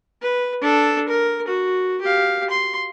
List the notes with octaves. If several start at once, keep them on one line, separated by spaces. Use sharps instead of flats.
B4
D4 A4
A#4
F#4
G4 F5
C6